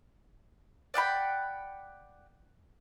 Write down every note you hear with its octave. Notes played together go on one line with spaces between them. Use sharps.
D5 F#5 G5 B5